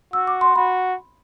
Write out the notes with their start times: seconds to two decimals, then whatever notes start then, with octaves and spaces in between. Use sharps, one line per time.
0.13 F#4 E6
0.27 D6
0.41 C6
0.56 F#4 B5